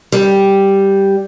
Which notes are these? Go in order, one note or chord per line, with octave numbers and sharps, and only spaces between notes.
G3